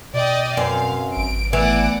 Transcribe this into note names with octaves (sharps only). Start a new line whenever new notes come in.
B2 D5 D#5 G5
F#2 C4 B4 F5 G#5
G#1 D7
E3 A3 B3 D5 F#5 D7